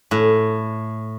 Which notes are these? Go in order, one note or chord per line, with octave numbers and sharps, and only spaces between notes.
A2